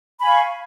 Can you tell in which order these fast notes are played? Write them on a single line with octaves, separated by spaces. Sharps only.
B5 G#5 F5 C#6